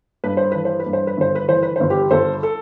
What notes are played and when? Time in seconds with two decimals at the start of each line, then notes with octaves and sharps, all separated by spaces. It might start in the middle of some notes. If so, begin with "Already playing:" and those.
0.24 G2 B4
0.37 C5
0.52 E3 B4
0.65 C5
0.80 B4
0.86 G2
0.93 C5
1.07 B4
1.17 G1 C5
1.35 B4
1.48 E3 C5
1.63 B4
1.76 G1 C5
1.90 G4 B4
2.11 G1 A4 C5
2.43 A4